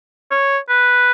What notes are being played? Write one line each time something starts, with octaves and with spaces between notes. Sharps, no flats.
C#5
B4